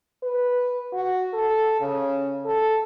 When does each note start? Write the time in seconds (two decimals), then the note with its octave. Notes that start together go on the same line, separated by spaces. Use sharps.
0.23 B4
0.92 F#4
1.34 A4
1.81 C#3
2.45 A4